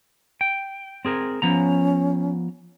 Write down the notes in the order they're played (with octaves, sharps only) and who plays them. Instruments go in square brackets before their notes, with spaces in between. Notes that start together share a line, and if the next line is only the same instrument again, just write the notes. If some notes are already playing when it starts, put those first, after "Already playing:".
[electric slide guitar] G5
C4 G#4 A#4
[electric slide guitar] F3 B3 A#5 [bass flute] C#4